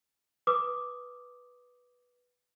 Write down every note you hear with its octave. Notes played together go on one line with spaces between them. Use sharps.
B4 D6 D#6